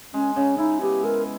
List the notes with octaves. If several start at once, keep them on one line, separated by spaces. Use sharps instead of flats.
G#3 C#4
C#3 C#4
D#4 E4
B3 G4
G#3 A#4